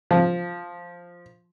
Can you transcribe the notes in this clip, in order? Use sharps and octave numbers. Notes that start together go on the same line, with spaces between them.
F3